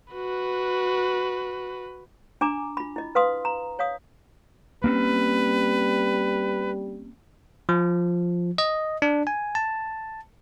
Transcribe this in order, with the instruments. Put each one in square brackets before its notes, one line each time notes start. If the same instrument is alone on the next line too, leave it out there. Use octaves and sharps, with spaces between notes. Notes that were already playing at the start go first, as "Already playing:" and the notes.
[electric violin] F#4 B4
[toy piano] D4 G#5 A#5 D6
F4 B5
E4 D#5
B4 F5 C6 D#6
A#5
C#5 F5 D#6
[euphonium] G3 [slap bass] A#3 C4 C#4 [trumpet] B4
[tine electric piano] F3
D#5
D4
G#5
A5